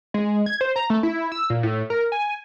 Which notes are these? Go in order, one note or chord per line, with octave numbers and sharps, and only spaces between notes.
G#3
G#6
C5
A#5
A3
E4
E6
A#2
A2
A#4
G#5